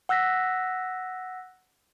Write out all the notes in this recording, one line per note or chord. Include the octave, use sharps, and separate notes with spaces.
F#5 E6 F#6 A#6 B6